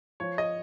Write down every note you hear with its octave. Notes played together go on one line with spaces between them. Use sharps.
F3 C#5
D#5